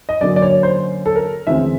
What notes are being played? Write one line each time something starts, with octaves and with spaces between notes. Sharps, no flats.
D#5
F#2 D3 F#3 A#3 C#4 D5
D5
C#5
C5
A4
A#4
D2 C#3 E3 G#3 C4 E5